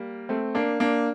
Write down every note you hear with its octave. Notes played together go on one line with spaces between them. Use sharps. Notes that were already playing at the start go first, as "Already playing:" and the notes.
Already playing: G3 A#3
A3 C4
A#3 D4
A#3 D4